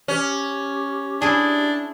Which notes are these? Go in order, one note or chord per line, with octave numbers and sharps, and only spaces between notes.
C#4 G4
D4 E4 G#4